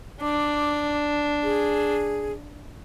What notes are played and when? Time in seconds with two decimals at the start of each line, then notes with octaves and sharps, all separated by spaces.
0.21 D4 D6
1.43 G#4